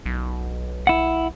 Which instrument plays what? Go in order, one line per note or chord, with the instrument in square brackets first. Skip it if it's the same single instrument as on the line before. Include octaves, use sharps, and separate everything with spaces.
[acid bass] B1
[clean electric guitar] E4 F#5